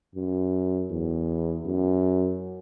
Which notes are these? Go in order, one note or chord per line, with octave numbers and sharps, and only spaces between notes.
F#2
E2
F#2